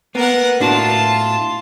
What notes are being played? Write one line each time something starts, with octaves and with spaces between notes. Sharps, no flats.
A#3 B3 A#4 F#5
A2 D4 F4 F#4 A5